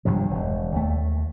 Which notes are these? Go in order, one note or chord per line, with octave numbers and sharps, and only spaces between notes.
G#1 G2 C3 F3
E1
D#2 A3